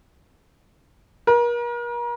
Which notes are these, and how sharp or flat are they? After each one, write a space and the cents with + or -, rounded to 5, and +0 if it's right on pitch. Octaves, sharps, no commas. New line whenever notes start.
A#4 +40